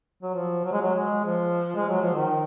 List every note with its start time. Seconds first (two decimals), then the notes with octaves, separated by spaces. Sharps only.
0.23 F#3
0.34 F3
0.64 F#3
0.72 G#3
0.81 F#3
0.94 G#3
1.24 F3
1.76 G#3
1.89 F#3
2.02 F3
2.14 D#3